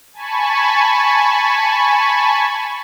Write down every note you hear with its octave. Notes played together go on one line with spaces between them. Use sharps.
G#5 A5 B5 C#6